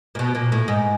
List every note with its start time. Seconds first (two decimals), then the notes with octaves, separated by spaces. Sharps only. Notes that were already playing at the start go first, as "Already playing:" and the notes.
0.15 A#2
0.19 B2
0.35 A#2
0.52 A2
0.68 G#2